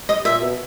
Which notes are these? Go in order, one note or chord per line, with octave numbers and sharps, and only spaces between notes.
D#5
A#2 E5
B2